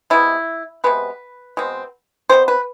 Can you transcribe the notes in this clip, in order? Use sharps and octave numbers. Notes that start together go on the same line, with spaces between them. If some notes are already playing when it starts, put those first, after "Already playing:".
C3 G#3 B3 E4
C3 G#3 B3 B4
B2 G#3 C4
B2 G#3 C4 C5
B4